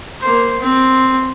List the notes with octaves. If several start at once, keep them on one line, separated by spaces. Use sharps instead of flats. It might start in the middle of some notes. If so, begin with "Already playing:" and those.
A#3 C5
C4